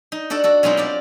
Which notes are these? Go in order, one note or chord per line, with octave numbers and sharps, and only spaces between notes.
D#4
D4 F#4 A4 D5
F#4 A4
B2 F#3 G#3 C4 D#4 F4
G4 A#4 D5